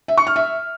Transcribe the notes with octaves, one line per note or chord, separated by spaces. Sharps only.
E5
C#6
F6
E5